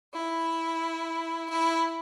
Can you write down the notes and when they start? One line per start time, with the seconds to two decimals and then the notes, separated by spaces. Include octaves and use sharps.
0.13 E4
1.48 E4